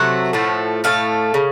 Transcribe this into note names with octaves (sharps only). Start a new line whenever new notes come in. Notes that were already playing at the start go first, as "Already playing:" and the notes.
Already playing: C3 F#3 A3 F#5
A2 F3 A3
A2 A3 F5
C#3